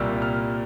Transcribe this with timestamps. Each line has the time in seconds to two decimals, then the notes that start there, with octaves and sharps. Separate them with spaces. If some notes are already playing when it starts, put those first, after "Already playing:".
Already playing: C2 A#2 G3 A#3 E6
0.22 F6